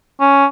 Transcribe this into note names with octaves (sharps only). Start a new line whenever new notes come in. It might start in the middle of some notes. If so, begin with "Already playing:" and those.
C#4